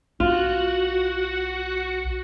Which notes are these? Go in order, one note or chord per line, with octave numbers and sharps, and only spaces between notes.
B1 F4 F#4 F#5